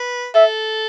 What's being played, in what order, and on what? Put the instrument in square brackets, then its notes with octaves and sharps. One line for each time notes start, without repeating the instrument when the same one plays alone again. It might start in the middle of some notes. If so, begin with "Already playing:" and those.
Already playing: [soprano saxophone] B4
[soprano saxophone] A4 [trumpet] E5